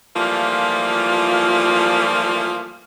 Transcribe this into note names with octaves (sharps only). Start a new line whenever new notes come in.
E3 F3 G3 A3 A#3 F4